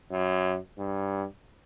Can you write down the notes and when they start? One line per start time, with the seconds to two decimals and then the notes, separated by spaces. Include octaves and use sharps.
0.10 F#2
0.78 G2